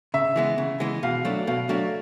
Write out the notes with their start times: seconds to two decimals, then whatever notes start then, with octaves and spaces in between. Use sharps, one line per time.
0.14 C#3 E5
0.36 E3 G#3 B3
0.58 C#3
0.80 E3 G#3 B3
1.03 B2 F5
1.25 F#3 A3 D4
1.47 B2 F5
1.69 F#3 A3 D4 F5